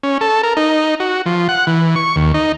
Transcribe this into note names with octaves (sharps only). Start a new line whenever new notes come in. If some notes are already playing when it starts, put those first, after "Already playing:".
C#4
A4
A#4
D#4
F#4
F3
F#5
E3
C#6
D#2
D#4